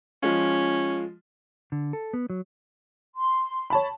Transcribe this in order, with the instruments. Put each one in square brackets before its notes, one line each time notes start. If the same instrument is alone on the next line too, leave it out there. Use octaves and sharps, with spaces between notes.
[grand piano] F3 G#3 F4 [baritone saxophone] C#4
[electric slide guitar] D3
A4
B3
F#3
[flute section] C6
[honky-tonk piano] C#5 A5 B5